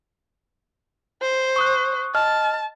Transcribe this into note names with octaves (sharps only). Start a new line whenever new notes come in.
C5
C#6 D#6 F#6
D#5 A5 F6